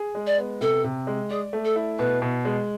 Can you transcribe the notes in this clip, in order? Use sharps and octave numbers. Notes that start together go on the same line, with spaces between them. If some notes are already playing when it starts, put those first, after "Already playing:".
Already playing: G#4
G#3
D5
B3
C3 A4
C3
G#3
G#4 D5
A3
A4
E4
B2 B4
B2
G#3